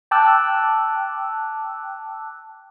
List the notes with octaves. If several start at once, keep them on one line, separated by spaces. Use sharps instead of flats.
G5 A5 D6 E6 F#6